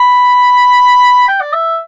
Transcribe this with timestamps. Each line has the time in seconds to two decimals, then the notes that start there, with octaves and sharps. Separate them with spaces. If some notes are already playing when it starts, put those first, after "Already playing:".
Already playing: B5
1.28 G5
1.41 D5
1.53 E5